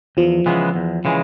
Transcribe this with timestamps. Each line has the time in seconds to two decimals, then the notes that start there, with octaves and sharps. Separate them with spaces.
0.17 E2 F3
0.46 C#3 E3 G#3 B3
0.75 E2
1.05 C#3 E3 G#3